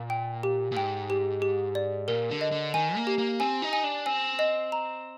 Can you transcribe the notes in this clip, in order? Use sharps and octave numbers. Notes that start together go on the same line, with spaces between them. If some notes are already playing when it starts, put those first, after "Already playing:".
Already playing: A#2
G5
G4
A#2
G#2 G5
G4
G4
D5
A#2 A#4
D3
D#5
D3
D#3 G#5
A#3
G4
A#3
C4 G#5
D#4
G#5
D4
C4 G#5
D#5
A#5